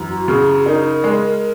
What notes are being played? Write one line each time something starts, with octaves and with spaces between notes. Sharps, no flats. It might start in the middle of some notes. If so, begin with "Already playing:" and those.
Already playing: F#2 E3
F#4
C#3 G#4
G#4
D#4 A#4
G#3